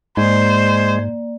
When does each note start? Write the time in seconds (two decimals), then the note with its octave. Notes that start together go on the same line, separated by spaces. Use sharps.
0.17 G#2 G#3 A#3 C5 D5